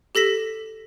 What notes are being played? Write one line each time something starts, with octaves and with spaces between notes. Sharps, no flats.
G4 A4 A#6 B6 E7